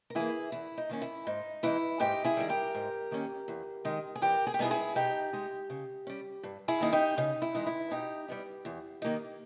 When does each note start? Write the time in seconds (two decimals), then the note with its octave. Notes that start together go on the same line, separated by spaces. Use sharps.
0.10 A#4
0.15 E3 A#3 E4 G#4
0.52 E2 E4
0.78 D#4
0.89 D#3 A#3 C#4
1.02 E4
1.27 G#2 D#4
1.63 E3 G#3 D#4 E4
2.00 G#2 D#4 G4
2.24 E4 G#4
2.37 D#3 G3
2.49 G4 A#4
2.75 G#2
3.11 D#3 A#3 C#4
3.48 E2
3.85 D#3 G#3 D#4
4.15 G#4
4.22 E2 G4 A#4
4.47 G#4
4.54 G4
4.59 B2 G3 B3 D#4 E4 G#4
4.71 E4 G#4
4.95 B2 D#4 G4
5.33 G#3 D#4
5.70 C#3
6.07 G3 C#4
6.43 G2
6.68 E4 G#4
6.80 D#3 A#3 D#4
6.93 D#4 G4
7.18 C#3 D#4
7.42 E4
7.55 E3 G#3 D#4
7.67 E4
7.91 B2 D#4 G4
8.28 G3 B3 D#4
8.65 E2
9.02 D#3 A#3 D#4